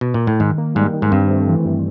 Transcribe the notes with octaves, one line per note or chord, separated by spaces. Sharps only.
B2
A#2
A2
G#2 D#3
A#3
G#2 G3
D#3
G#2
G2 C4
A3
E3
G2